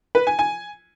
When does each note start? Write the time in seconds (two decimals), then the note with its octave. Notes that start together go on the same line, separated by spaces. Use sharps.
0.15 B4
0.27 G#5
0.39 G#5